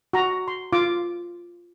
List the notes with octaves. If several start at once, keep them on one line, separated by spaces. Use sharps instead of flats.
F#4 A#5
C6
F4 D6